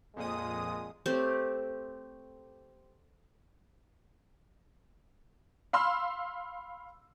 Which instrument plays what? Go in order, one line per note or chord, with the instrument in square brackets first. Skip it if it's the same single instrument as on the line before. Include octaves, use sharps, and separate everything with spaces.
[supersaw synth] F2 A#2 D#6 [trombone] G#3
[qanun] A3 C4 G4
[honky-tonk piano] F5 B5 C6 E6 F6